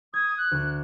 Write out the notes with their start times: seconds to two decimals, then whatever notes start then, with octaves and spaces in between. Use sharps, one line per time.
0.14 D#6 G#6
0.38 F#6
0.51 D2